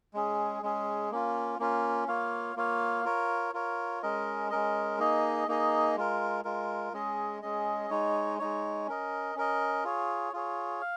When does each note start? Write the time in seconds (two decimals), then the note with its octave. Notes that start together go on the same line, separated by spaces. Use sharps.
0.14 G#3 C#4 G#4
0.63 G#3 C#4 G#4
1.11 A#3 C#4 F4
1.59 A#3 C#4 F4
2.08 A#3 F4 C#5 F5
2.56 A#3 F4 C#5 F5
3.05 F4 A#4 C#5
3.53 F4 A#4 C#5
4.03 G#3 C#4 A#4 D#5
4.50 G#3 C#4 A#4 D#5
4.99 A#3 D#4 G#4 D#5
5.48 A#3 D#4 G#4 D#5
5.96 G#3 F4 A#4
6.44 G#3 F4 A#4
6.93 G#3 C#4 G#4 D#5
7.42 G#3 C#4 G#4 D#5
7.90 G#3 D#4 C#5
8.39 G#3 D#4 C#5
8.87 C#4 A#4 D#5
9.36 C#4 A#4 D#5
9.84 F4 G#4 C#5
10.33 F4 G#4 C#5
10.81 F5